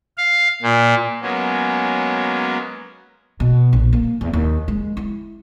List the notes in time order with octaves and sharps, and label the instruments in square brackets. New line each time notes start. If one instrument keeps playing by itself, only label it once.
[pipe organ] F5
A#2
F#3 G#3 A#3 B3 C#4
[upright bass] B2
A#1
A#3
E2
D#2
G#3
E4